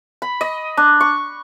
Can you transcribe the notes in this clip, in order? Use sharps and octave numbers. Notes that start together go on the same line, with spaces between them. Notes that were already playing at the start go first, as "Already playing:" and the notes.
B5
D#5
D4
C#6